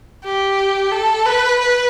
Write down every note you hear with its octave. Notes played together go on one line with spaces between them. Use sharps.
G4
A4
B4
B4